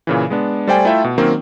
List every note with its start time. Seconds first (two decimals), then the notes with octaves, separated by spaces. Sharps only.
0.07 A#2 C#3 E3
0.30 G#3 B3 D4
0.67 G3 A3 C5 D5 G5 G#5
0.85 A3 E4 F4 A4 E5 G5
1.04 B2
1.18 D#3 F#3 A#3 C4 C#4